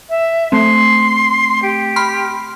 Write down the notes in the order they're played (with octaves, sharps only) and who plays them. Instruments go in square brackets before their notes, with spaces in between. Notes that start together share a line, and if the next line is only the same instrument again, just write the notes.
[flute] E5
[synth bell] A3 C4 [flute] C6
[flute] G4
[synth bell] B5 C6 F6